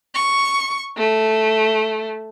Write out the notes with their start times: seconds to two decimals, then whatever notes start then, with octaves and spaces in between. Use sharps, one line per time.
0.15 C#6
0.97 A3